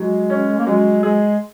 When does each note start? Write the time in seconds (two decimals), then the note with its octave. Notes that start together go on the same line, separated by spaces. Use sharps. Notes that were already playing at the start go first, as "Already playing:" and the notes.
Already playing: F#3 G#3
0.30 C#4
0.58 A#3
0.67 F#3 G#3
1.03 G#3 G#4